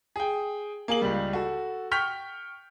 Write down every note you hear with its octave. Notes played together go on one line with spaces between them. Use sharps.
G#4 G5
A#3 G#4 F#7
C#2 G3
F#4 A4
G5 C#6 F6 G6 B6 F7